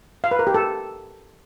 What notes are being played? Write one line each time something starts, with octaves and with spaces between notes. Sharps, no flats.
F5
B4
A#4
G4
A4